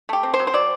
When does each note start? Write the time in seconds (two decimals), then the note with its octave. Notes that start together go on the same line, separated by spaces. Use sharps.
0.09 A3 G4
0.23 C4
0.34 C5
0.40 F#3
0.47 C5
0.54 F#3 D5